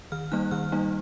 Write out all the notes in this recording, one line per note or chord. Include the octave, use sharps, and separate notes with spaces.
D#3 F6
G3 A#3 D#4 F#6
D#3 F6
G3 A#3 D#4